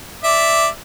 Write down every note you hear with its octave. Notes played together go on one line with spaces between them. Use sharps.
D5 E5